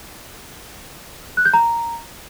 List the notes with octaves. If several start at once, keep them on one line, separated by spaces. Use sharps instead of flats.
F#6
G6
A#5